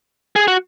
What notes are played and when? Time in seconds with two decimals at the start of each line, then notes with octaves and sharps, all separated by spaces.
0.36 G#4
0.48 F#4